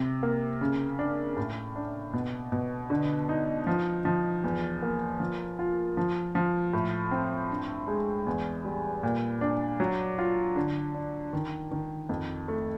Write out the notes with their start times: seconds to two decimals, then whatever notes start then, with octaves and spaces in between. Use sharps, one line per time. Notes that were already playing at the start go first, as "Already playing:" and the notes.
Already playing: C3
0.23 A#3
0.61 C#3
0.99 D4
1.37 A2
1.76 D4
2.13 B2
2.52 B2
2.90 D3
3.29 D#4
3.67 F3
4.05 F3
4.44 E2
4.82 A#3
5.20 F3
5.59 F4
5.97 F3
6.35 F3
6.73 A2
7.11 C4
7.51 G2
7.88 G#3
8.27 E2
8.65 G3
9.03 A#2
9.41 D4
9.80 F#3
10.19 F4
10.56 D3
10.94 D4
11.33 D#3
11.71 D#3
12.09 F2
12.48 A3